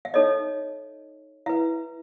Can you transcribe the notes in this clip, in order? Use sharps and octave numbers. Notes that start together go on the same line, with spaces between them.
E5
D#4 A4 C#5 D#5
E4 B4 E5